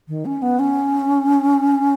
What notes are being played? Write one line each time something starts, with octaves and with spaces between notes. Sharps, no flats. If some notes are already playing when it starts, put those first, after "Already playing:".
D#3
C#4
B3
C#4